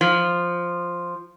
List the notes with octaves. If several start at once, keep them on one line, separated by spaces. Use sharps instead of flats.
F3